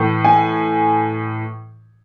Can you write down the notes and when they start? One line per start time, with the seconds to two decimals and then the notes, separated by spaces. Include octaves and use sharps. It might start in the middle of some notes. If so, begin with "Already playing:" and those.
Already playing: A2 E3 A3
0.25 G#5